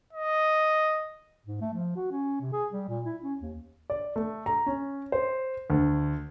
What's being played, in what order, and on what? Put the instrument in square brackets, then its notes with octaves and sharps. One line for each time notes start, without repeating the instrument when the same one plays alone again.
[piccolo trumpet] D#5
[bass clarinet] G#2
A3
F3
F#4
C#4
C3
G#4
G3
A#2
E4
C#4
D#2
[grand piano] D5
A3
A#5
C#4
C5
D2